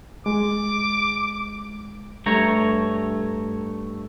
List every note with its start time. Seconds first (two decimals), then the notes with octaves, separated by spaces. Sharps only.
0.26 G#3 D6
2.26 G2 A3 C#5 A#5